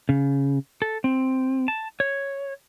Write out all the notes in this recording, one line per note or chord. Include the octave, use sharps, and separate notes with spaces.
C#3
A4
C4
A5
C#5